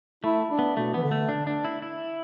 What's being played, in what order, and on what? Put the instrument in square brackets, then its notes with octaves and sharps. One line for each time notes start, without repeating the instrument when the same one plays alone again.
[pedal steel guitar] A3 [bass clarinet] E4
[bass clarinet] D4
[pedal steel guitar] B3
[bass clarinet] B2 [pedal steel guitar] A3
[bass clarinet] E3 [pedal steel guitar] B3
[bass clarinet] D3
[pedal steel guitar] A3
D4
D4
E4
E4